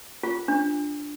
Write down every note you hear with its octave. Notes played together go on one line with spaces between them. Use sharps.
F4
D4